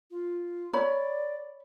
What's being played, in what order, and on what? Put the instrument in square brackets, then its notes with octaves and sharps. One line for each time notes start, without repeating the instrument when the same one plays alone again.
[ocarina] F4
[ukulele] C#5 B5 [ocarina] D5